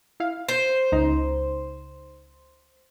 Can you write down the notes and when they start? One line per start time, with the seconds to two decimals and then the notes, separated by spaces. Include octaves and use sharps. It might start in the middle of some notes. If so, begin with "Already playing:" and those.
0.20 E4 F5
0.48 C5
0.92 C#2 D#4 A#5